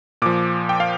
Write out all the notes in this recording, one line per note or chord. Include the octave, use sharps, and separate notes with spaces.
A#2 F3 D6
G5
F5